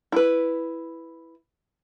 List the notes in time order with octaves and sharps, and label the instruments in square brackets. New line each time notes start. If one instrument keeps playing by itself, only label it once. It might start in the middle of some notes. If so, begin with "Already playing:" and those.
[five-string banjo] E4 B4